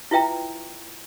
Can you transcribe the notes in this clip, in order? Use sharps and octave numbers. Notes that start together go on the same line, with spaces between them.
E4 F4 B4 E5 G5 A#5